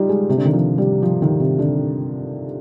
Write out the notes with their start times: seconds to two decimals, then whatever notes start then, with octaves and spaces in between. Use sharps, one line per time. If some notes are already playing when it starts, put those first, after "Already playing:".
Already playing: G3 D#4 F4
0.09 G#3
0.29 C3
0.37 D3
0.45 D#3
0.53 F3
0.78 G3
1.03 F3
1.22 D#3
1.40 C3
1.59 D3